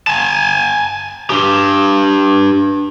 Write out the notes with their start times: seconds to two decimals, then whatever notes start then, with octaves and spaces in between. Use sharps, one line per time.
0.07 G#5 A5
1.30 D4 G4